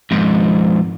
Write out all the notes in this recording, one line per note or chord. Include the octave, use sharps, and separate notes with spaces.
F2 G#2